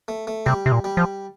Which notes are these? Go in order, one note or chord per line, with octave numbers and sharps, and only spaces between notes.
A3
A3
C3 G3
C3
A#2
G3
F3